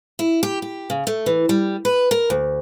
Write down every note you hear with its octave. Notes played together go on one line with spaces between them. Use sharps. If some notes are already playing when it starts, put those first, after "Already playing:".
E4
G4
G4
C#3
A3
E3
G3
B4
A#4
D2